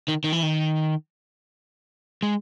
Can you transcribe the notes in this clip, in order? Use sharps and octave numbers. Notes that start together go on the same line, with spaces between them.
D#3
D#3
E3
D#3
G#3